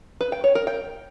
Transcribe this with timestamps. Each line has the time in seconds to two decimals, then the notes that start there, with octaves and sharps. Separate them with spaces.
0.21 B4
0.32 G5
0.44 C#5
0.55 A#4
0.67 G5